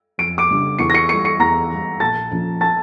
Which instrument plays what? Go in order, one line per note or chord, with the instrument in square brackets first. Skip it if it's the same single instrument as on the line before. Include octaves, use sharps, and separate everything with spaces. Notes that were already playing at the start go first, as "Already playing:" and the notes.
[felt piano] F2 [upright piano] D7
[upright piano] D6 D7
[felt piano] C#3 G3 D4
[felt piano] E2 [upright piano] C#6 C#7
[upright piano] A#6
C#6 C#7
[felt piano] E3 G3 [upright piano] C#6 C#7
[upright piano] C#6 C#7
[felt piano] E2 [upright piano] A#5 A#6
[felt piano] E3 G3
[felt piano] A#1 [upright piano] A5 A6
[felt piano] A#2 F3 C#4 F4
[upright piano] A5 A6